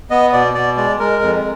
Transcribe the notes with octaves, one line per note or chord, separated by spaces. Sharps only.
B3 D#5
B2 D5
B2 D5
G#3 D5
G#3 A#4
F2